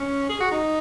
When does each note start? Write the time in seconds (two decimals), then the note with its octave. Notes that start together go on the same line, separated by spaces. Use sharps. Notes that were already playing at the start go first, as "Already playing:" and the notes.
Already playing: C#4
0.29 G#4
0.40 F#4
0.51 D#4